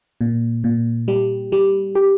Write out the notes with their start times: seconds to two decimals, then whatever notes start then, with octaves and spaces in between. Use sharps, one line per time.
0.21 A#2
0.64 A#2
1.08 G3
1.52 G3
1.95 G4